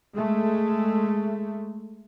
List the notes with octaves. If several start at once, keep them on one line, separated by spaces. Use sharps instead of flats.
G#3 A3